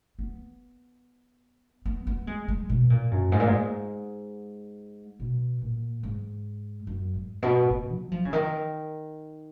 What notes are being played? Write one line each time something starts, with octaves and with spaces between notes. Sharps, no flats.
B3
B3
B3
G#3
G#3
B2
A#2
F#2
G#2
A#2
G#2
B2
A#2
G#2
F#2
G#2
B2
A#2
F#3
F3
C#3
D#3